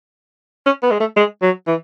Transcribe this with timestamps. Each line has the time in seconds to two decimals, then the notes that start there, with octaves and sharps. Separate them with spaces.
0.66 C#4
0.83 B3
0.91 G#3
1.00 A3
1.17 G#3
1.42 F#3
1.67 E3